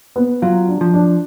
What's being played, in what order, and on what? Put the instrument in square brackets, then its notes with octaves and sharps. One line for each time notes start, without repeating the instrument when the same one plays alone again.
[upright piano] B3
[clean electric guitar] F#3 [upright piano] F4
[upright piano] D4
[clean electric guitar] F3
[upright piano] D4